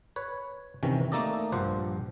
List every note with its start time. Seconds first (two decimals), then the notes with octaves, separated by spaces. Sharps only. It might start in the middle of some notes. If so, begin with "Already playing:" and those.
0.16 B4 C#5
0.83 C3 D#3 E3 C#4
1.12 A3 A#3 D#4 A4 D5 D#5
1.52 A#1 G2 F3 C5 F#5